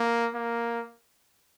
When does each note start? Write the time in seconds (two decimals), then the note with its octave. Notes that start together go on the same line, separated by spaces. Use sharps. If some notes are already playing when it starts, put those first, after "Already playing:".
Already playing: A#3
0.34 A#3